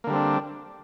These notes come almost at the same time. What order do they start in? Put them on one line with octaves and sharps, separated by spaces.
A#3 D3 G3 C4 D4